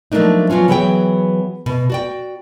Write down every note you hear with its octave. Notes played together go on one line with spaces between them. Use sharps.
F3 F#3 A3 A#3 D4 D#4
F3 F#3 B3 C#4 F4
E3 F#3 B3 G#4 C#5 G5
B2
F#4 D5 G5